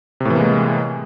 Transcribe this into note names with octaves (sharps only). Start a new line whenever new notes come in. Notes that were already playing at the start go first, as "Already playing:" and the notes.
A2 C3 E3 G#3 A#3